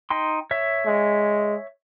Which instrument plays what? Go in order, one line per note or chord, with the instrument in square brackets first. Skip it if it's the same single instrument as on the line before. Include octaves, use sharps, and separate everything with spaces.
[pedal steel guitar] D#4 G5 C6
C#5 E5
[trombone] G#3